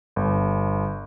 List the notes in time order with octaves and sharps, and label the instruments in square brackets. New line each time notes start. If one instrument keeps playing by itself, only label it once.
[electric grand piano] G1